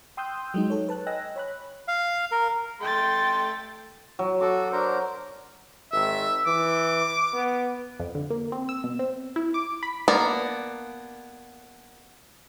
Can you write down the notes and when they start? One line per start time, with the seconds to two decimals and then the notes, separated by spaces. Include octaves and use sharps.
0.17 G5 C6 D#6 E6 F#6 G6
0.54 F#3 G#3 D#4
0.70 A4 C#5
0.88 B4 A5 F#6
1.06 D#5 G5 G#5 E6 F#6 A#6
1.36 C#5 B5 F#6
1.88 F5
2.32 A#4
2.81 A3 G5 C6 A6
4.19 F#3
4.41 F#4 A4 D6
4.72 D4 A#4 C5
5.93 G#1 E5
6.47 E3 D6
7.34 B3
8.00 F2
8.15 D3
8.30 A#3
8.52 C4
8.69 E6
8.84 B2
8.99 C4
9.36 E4
9.54 D6
9.83 B5
10.08 A#3 B3 D4 A#4 D5